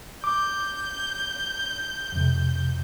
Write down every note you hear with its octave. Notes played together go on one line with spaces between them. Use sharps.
D6 G6
F2 C3